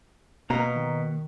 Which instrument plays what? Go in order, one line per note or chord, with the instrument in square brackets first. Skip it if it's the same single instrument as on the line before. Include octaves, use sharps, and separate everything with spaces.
[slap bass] B2 [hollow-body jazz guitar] A#3 F5 A#5
[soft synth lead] D#3